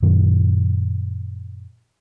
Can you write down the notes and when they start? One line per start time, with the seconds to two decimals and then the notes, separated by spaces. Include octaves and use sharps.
0.03 F#2 A#2 D#3 F#3